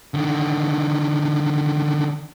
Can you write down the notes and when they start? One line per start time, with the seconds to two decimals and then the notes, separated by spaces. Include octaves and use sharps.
0.14 D3 D#3